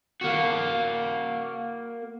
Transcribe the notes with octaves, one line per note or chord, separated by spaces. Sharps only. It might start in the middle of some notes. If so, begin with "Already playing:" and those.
A#3 F#4